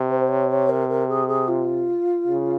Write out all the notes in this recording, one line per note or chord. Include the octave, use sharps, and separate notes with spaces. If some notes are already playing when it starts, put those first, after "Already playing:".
Already playing: C3
C5
C5
C#5
C#5
A#4
A#4
G#4
G#4
F4
C#3